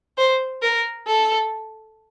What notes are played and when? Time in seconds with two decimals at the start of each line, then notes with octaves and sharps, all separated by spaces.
0.18 C5
0.62 A#4
1.07 A4